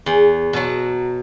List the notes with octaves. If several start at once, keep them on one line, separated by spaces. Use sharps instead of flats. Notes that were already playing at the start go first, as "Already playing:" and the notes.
E2
B2 F#3